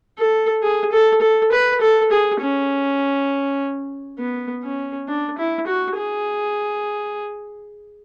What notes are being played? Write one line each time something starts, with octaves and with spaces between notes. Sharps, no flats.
A4
G#4
A4
A4
B4
A4
G#4
C#4
B3
C#4
D4
E4
F#4
G#4